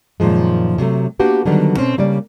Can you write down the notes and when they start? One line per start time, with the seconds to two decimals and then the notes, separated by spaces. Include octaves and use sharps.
0.20 F#2 A#2 D#3 F3 G#3
0.78 C3 F#3 G#3 A3
1.19 A#3 B3 D4 F#4 G4 B4
1.46 D3 D#3 F#3 G3 B3
1.77 B2 C4 C#4
1.98 C#3 G3 A#3 D5